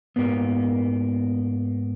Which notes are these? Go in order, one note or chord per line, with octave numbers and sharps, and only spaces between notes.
G#2 A#3 B3